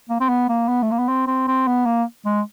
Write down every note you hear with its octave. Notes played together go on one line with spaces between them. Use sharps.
A#3
C4
B3
A#3
B3
A3
A#3
B3
C4
C4
C4
B3
A#3
G#3